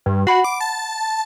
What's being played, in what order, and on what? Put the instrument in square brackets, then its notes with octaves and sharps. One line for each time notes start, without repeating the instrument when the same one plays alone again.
[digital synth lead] G2
[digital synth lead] F#4 [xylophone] F#5 B5 C7
[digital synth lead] D6
A5